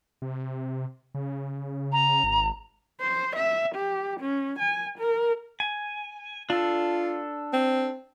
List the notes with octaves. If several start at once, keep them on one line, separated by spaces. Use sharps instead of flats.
C3
C#3
A#5
G#1
C5
E5
G4
C#4
G#5
A#4
G#5
D4 F4 A4
C4